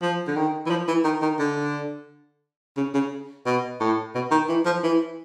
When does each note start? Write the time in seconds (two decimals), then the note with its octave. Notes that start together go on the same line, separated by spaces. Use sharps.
0.02 F3
0.27 D3
0.36 D#3
0.66 E3
0.70 F3
0.88 E3
1.05 D#3
1.22 D#3
1.39 D3
2.77 C#3
2.94 C#3
3.46 B2
3.80 A2
4.15 B2
4.31 D#3
4.49 E3
4.65 F3
4.83 E3